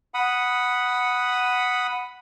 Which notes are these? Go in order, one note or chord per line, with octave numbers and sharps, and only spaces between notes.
F#5 B5 D#6